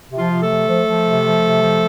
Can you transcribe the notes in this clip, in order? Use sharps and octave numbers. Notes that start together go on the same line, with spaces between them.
C3
F3 F4
C3
A3 A4
F3
F3
F3
C3
F3
C3
F3